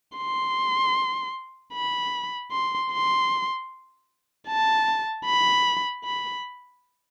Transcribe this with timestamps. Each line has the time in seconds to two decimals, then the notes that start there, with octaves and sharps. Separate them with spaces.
0.17 C6
1.73 B5
2.52 C6
2.92 C6
4.48 A5
5.26 B5
6.05 B5